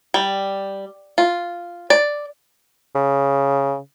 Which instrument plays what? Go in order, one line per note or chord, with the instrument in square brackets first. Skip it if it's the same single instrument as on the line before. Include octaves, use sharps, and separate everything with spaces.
[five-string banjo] G3
F4
D5
[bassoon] C#3